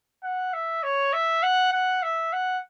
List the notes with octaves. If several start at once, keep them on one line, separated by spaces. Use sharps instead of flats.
F#5
E5
C#5
E5
F#5
F#5
E5
F#5